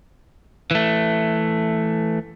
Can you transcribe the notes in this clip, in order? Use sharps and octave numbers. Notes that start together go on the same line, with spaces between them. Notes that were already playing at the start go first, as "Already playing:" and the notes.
E3 A3